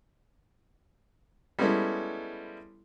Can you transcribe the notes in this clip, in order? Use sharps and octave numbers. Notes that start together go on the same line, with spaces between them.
G3 G#3 B3 C#4 E4 A4